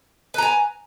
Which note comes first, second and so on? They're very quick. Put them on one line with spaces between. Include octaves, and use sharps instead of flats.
B4 A#5 G#5